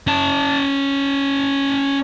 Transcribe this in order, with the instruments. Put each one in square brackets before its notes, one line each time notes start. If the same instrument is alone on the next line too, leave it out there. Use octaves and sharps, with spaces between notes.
[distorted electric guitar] C#4 A5